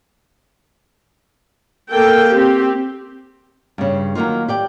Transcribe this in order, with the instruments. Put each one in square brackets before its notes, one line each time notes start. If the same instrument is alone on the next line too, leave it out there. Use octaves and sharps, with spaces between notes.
[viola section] A#3 A4 G5
C4 G4
[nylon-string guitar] G2 C#3
D#3 F#3 A#3 D#4 F4
G4 D5 G5